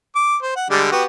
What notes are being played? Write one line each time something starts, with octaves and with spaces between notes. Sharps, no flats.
D6
C5
F#5
D3 G3 G#3
B3 F#4 G4